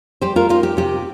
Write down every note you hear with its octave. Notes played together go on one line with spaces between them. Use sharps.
G3 G4 C5
F4 A#4
D#4 F4
G4
C3 G4